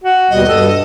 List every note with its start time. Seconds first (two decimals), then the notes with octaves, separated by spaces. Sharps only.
0.04 F#4
0.31 D#2 B2 G3 D#5
0.47 G2 A4